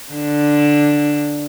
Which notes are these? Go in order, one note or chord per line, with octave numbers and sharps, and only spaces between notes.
D3 D4